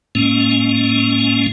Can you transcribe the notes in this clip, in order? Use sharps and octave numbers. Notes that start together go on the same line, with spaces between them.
A2 G#3 A#3 C#4